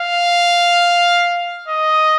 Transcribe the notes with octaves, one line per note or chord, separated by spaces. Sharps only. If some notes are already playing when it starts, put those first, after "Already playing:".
Already playing: F5
D#5